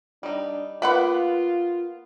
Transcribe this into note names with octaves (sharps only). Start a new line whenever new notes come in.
G3 D4 D#4
A#3 B3 F4 B4 F#5 B5